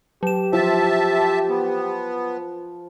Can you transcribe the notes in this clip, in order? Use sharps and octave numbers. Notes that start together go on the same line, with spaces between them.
F#3 G4 E7
F3 E5 A5
B3